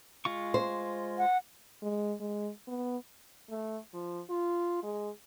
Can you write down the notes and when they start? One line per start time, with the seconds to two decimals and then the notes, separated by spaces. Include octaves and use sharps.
0.25 G#3 F4 C#6
0.54 C5
1.18 F#5
1.82 G#3
2.20 G#3
2.67 B3
3.50 A3
3.94 F3
4.30 F4
4.83 G#3